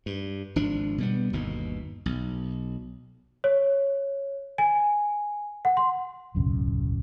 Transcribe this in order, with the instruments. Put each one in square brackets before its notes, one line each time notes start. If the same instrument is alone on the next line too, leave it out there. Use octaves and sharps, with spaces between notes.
[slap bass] G2
G#1 F3 D4
B2 G3 B3
G1 D#2 B2
B1
[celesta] C#5
G#5
F#5
C6
[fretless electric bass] D1 B1 F#2 C#3